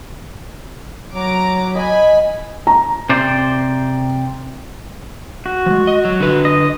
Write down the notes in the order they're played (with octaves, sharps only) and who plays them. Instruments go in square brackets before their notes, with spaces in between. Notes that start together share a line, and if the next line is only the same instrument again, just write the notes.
[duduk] F#3 [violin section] A#5 D6
[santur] D#5 [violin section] G#5 B5
[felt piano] A#5
[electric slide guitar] C3 C5 D5
[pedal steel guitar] F#4
[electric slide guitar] F3 G#3
D#5
F#3
D3 B4
[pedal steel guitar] D#5